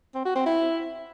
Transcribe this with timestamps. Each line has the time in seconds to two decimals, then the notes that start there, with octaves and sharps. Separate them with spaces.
0.15 C4
0.25 F#4
0.36 C4
0.46 E4